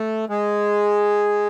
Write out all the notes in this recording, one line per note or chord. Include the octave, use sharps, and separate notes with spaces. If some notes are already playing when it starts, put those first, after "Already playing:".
Already playing: A3
G#3